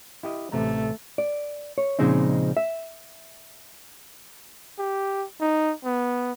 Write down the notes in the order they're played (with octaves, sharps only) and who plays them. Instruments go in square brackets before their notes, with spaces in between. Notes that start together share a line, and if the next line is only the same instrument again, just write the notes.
[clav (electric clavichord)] E4 G4 D#5
[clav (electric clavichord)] A1 C3 A#5 [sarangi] A3
[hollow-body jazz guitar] D5
C#5
A#2 C#3 F3 G#3 C4 D#4
E5
[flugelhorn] G4
D#4
B3